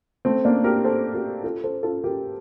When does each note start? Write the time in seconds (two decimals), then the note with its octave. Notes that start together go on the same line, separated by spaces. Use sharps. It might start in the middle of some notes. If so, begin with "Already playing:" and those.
0.25 A3 C4
0.45 A#3 D4
0.64 G4 A#4
0.84 A4 C5
1.14 G4 A#4
1.44 F4 A4
1.64 A4 C5
1.83 F4 A4
2.04 G4 A#4